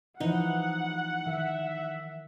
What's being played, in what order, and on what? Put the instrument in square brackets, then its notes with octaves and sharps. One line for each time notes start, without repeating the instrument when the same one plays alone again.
[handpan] E3 F3 E4 [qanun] D#4 [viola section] F#5
[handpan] D#3 [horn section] E5